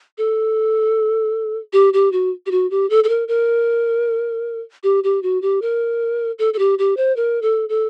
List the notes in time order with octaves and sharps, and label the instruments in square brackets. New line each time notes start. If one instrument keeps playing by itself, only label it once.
[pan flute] A4
G4
G4
F#4
G4
F#4
G4
A4
A4
A#4
A#4
G4
G4
F#4
G4
A#4
A4
A4
G4
G4
C5
A#4
A4
A4